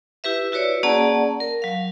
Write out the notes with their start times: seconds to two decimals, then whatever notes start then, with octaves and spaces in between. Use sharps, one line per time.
0.24 E4 G4 B4 E5
0.52 E4 F#4 B4 C#5 D5
0.83 A#3 C#4 G#4 D5 F#5 A5
1.40 A#4
1.62 F#3 F5